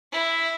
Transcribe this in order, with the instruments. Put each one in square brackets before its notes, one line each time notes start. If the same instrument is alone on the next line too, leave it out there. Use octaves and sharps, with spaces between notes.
[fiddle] E4